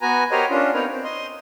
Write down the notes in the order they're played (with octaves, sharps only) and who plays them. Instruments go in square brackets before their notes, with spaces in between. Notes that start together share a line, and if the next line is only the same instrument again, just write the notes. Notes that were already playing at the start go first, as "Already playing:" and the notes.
[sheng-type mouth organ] B3 F#4 B4 G#5 A#5
F#4 G4 A#4 C5 C#5 D#5
C#4 D4 F4
B3 C4 D#4 A#4 B4 C#5
C4
D#5 C6